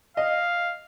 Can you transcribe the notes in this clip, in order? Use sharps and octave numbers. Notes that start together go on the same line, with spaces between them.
D#5 F5